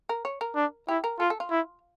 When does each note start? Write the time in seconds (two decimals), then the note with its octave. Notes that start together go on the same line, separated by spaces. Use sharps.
0.09 A#4
0.25 C#5
0.41 A#4
0.56 D4
0.88 E4 G4
1.04 A#4
1.19 F4 A4
1.30 A4
1.40 F4
1.51 E4